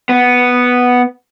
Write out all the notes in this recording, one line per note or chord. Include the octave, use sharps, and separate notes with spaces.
B3